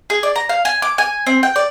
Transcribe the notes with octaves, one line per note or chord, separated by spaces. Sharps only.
G#4
D5
A#5
F5
G#5
D6
G#5
C4
G5
D5